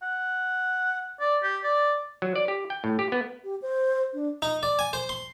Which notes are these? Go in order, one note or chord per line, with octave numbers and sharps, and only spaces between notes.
F#5
D5
G4
D5
F#3
D5
G4
G5
A2
G4
B3
G4
C5
D4
D#4
D5
G#5
C5
C6